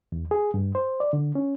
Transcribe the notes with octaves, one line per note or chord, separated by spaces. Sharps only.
E2
G#4
G2
C5
D5
D3
C#4